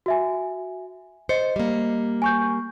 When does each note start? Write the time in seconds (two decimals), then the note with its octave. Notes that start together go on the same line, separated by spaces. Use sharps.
0.06 F#4 E5 G#5
1.29 C5 D#5 C#7
1.56 G3 A#3
2.22 G#5 C#6 G6